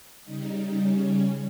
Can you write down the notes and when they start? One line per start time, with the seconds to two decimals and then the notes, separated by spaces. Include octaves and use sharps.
0.25 C#3 G3 D#4
0.76 C#4